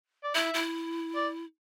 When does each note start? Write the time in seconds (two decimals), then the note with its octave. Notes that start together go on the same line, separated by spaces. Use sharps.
0.24 D5
0.35 E4 E5
0.54 E4
1.15 D5